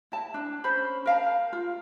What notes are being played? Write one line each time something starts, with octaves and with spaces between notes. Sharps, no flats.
E4 A5
D4
C#4 C5 B5
A#4 F5 A5
F4